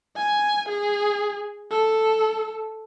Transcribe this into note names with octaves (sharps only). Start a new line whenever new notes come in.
G#5
G#4
A4